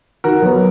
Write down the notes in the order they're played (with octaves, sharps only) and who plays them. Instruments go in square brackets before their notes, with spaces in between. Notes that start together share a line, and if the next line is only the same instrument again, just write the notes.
[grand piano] D#3 [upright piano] F#4 A#4
[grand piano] F#3 B3